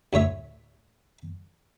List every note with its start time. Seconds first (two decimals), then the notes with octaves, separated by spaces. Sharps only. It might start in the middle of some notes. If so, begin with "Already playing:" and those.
0.13 D2 A2 C#5 E5